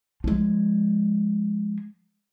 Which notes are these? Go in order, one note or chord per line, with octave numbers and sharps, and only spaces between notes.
F3 G#3